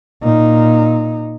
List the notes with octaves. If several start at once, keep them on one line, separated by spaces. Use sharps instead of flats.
A#2 D#4